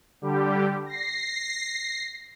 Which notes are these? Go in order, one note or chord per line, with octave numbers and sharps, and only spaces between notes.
D3 G3 G4
A#6 C7